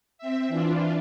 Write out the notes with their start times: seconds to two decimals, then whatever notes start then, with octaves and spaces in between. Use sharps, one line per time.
0.18 C4 E5
0.48 E3 D4 F4